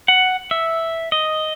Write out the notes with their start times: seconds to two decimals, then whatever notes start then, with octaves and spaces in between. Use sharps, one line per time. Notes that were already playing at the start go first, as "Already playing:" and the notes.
0.08 F#5
0.51 E5
1.12 D#5